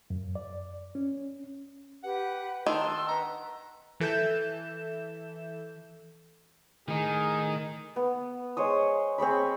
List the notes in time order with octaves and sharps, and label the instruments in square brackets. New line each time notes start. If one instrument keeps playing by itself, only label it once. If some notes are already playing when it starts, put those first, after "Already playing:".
[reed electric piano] F#2
D5
C#4
[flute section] G4 B4 [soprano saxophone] F#5
[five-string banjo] D#3 [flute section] D4 A5 E6 [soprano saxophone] C6
[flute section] B4 D#5 F#5 [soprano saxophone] A#5
[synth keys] E3 A4 E5 G6 E7
[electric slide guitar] A2 D#4 [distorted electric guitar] D#3 [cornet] G#4
[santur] B3
G#3 C5 C#5 D#6
C4 G#4 C#5 B5